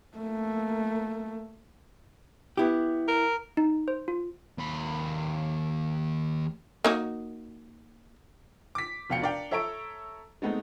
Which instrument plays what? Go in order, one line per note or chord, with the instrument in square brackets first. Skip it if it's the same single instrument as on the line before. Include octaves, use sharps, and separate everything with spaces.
[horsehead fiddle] A3 A#3
[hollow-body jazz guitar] B3 E4 G4
[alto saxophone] A#4
[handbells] D#4
C5
F4
[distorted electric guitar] D#2 B5
[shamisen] A#3 D#4 F#4
[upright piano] D6 B6
F1 B2 F5 G5 C#7
D4 A#4 D5 F5 G5
A4 C#5 E5 A#5 C#6 D7
G#3 A3 B3 C4 D#4